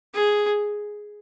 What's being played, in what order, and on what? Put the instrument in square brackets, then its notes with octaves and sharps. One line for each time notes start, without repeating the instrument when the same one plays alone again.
[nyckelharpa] G#4